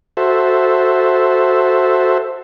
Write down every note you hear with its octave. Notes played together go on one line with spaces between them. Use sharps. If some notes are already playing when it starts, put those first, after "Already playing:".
F#4 A4 C5 E5